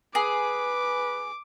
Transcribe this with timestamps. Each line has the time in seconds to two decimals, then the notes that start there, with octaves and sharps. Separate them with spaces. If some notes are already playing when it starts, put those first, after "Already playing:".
0.15 G#4 B4 D6